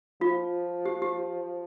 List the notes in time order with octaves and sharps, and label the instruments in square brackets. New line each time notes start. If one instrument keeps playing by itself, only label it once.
[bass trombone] F3 [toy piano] F4
[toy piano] G4
G4